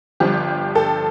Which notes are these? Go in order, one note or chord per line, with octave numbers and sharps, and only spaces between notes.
G1 G2 F3 G4
A4